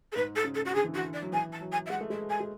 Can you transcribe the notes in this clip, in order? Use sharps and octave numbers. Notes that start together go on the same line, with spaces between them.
A4
G#2 B4
A4
C#3
A4
F#4
D3 G#4
E3
D3 F#4
D5
F#3
E3 G#5
A5
F#3
G#5
E5
G#3 F#5
A3
G#3 E5
G#5
G#3